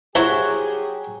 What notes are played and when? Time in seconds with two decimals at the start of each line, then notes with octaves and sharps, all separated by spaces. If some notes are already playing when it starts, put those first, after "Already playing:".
0.15 F#3 E4 G4 G#4 C5